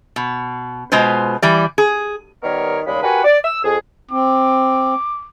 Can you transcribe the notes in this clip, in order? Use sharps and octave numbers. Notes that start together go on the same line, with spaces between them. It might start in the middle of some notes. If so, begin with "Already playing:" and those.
B2
B2 G#3 F4 B4 C5
E3 G3 D5
G#4
D#3 G3 B3 A#4 C#5
D#2 C#3 G3 G#3 B5
F#4 G4 A#4 B4 F#5 G#5
D5
E6
F2 G#4
C4 D6